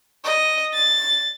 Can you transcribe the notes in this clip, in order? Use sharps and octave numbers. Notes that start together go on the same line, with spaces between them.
D#5
A6